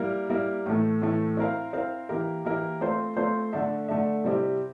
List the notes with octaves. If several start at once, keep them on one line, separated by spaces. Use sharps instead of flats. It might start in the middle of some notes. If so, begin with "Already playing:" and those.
Already playing: G3 A#3 E4 A#4
G3 A#3 E4 A#4
A2 E3 A3
A2 E3 A3
C4 E4 A#4 F5
C4 E4 A#4 F5
E3 A#3 E4 G4 A#4
E3 A#3 E4 G4 A#4
A3 C4 F4 C5
A3 C4 F4 C5
D3 A3 D4 A4 E5
D3 A3 D4 A4 E5
C3 G3 C4 E4 G4